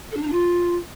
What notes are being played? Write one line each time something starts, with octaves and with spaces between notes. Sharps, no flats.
A4
D4
D#4
D4
F4